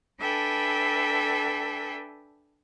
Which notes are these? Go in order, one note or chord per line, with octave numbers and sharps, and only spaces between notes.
D4 A4 B4 E5 G5 G#5